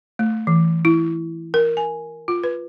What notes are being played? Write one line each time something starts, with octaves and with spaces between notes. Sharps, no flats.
A3
E3
E4
A#4
G#5
F4
B4